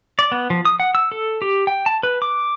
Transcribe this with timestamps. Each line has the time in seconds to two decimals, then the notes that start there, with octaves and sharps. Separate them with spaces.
0.19 D5
0.32 B3
0.50 F3
0.65 D#6
0.80 F#5
0.95 E6
1.12 A4
1.42 G4
1.67 G5
1.86 A5
2.03 B4
2.22 D6